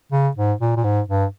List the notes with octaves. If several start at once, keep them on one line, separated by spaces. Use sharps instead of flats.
C#3
G#2
A#2
A#2
G#2
G2